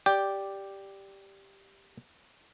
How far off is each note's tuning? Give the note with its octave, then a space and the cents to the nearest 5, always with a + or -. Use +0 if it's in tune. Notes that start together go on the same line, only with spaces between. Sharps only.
G4 +0 D5 -5 G5 +0